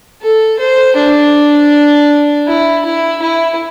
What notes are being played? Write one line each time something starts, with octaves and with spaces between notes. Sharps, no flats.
A4
C5
D4
E4
E4
E4